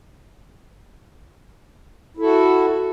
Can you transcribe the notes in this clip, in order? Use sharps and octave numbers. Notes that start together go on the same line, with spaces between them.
E4 F#4 A4